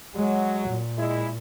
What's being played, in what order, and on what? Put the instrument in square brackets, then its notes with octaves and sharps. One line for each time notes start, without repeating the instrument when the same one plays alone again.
[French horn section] F#3 [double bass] G#3
[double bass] A#2
[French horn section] G#3 E4